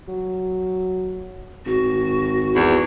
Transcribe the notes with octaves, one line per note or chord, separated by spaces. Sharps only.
F#3
G#1 F#4
E2